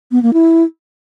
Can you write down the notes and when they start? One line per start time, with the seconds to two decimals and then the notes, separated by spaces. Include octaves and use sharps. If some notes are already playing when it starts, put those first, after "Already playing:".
0.12 B3
0.22 A#3
0.33 E4